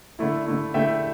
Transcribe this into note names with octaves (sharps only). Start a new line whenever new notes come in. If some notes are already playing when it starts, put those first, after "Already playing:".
D3 A3 E4
D3 A3 E4
D3 A3 E4 E5 G5